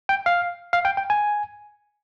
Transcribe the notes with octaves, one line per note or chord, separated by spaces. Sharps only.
G5
F5
F5
G5
G5
G#5